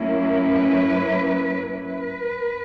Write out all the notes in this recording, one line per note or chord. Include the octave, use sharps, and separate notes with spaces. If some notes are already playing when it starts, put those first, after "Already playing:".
Already playing: F#3 A#3 C#4 E4
B4
B4